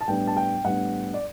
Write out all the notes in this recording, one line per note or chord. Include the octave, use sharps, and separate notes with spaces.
A5
A2 G3 B3 D4 G5
A5
G5
A2 G3 B3 D4 F#5
D5